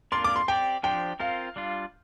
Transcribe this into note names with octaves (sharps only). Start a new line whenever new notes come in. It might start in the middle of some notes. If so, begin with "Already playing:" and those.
A#3 D4 F4 A#4 D5 C6
D6
C6
C4 G4 D5 G5
F3 D4 G4 C5 G5
C4 F4 A#4 F5
G3 D4 F4